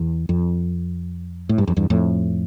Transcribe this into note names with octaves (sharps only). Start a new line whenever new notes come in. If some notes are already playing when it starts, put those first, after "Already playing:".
Already playing: E2
F2
A2
G2
F2
E2 G2
F2 A2